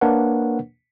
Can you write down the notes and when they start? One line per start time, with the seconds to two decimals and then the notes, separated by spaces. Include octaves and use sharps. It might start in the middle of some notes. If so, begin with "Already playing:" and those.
0.01 A#3 D4 A#4 B4 C#5 F#5